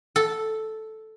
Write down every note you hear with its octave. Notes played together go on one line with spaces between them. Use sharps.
A4